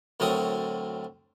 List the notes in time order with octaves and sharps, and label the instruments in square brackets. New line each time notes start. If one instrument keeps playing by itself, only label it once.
[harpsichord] D2 A2 F#3 C4 A#4 D#6